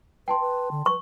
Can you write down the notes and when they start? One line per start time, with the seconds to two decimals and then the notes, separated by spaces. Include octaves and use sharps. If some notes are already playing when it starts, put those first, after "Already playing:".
0.28 B4 G5 A5 C6
0.40 B4
0.71 D3
0.86 B4 C#6